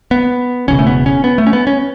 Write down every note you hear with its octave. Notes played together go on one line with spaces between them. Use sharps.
B3
E1 D#2 C#3 C#4
A3
B3
C#4
B3
A3
C#4
B3
C#4